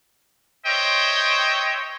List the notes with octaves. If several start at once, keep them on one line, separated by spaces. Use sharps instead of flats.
C5 C#5 D#5 E5 G5